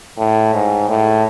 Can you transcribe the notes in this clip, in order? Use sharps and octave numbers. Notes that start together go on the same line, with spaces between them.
A2
G#2
A2